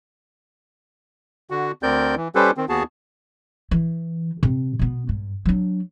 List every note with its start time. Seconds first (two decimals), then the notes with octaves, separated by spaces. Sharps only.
1.50 D3 F#4
1.83 D2 C4 A#4 D5 G6
2.16 E3
2.35 G3 C#4 G4 A4 B4 C5
2.57 D#3 C4
2.69 D#2 B3 F#4 G#4 A5
3.71 E3
4.43 C3
4.79 B2 B3
5.09 G2
5.46 F#3 D4